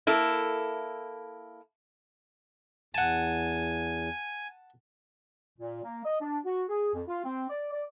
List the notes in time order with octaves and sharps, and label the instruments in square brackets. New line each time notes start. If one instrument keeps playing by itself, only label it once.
[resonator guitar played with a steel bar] A#3 E4 A4
[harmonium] E2 [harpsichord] F#5 A5 [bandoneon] G#5
[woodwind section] A#2
A#3
D#5
D4
F#4
G#4
F2
F4
C4
D5
D5